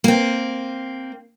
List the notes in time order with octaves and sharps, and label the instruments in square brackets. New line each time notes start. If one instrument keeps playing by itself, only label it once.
[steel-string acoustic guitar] A#3 C4